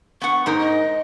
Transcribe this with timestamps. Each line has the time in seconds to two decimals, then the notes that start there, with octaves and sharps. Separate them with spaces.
0.22 B3 F#5 C#6
0.46 G#2 D#4 A#4
0.60 D#5